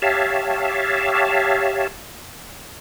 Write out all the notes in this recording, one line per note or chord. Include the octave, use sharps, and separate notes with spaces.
G4 C#5 E5 F5 A5